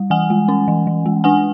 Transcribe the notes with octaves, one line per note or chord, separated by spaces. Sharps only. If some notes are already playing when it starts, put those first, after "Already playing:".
Already playing: G3
E3 F#5 G#5
G#3
C#4
E3
E3
G#3
D4 F#5 G#5